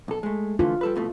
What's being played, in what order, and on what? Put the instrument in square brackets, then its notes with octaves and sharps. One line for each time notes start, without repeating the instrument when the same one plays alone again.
[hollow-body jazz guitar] B1 A4
G#3 A3
[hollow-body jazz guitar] D3 E3 A3 [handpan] F4
[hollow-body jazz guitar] G3 A4 B4
C2 B2 A3